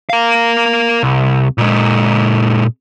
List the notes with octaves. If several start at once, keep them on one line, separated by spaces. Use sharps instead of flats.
A#4 F5
C2
A#2 G#3